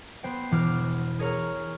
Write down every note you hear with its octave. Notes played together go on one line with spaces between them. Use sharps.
B3 C5 G5
E1 E3 D6 F6
G#4 A#4 C#5 A#5 F6